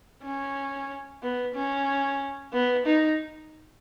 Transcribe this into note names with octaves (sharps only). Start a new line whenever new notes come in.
C#4
B3
C#4
B3
D#4